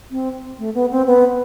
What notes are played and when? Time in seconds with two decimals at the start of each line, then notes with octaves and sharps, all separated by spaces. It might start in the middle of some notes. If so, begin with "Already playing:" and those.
0.11 C4
0.59 A3
0.74 B3
0.91 C4
1.07 B3